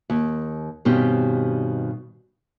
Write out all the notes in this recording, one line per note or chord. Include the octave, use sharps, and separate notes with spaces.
D#2
G2 B2 D#3 C4 C#4 G4